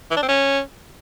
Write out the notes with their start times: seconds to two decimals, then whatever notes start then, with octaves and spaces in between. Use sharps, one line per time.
0.11 E3
0.17 D4
0.23 C4
0.29 C#4